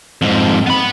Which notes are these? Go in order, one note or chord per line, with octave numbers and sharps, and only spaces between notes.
F2 G#2
B3 B5